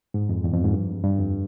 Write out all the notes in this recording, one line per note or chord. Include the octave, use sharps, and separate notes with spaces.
G#2
F2
E2
F2
G#2
G2
G2
F2